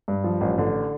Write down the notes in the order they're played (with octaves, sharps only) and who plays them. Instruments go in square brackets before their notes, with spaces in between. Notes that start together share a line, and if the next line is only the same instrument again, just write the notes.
[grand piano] G2
F3
A1
D3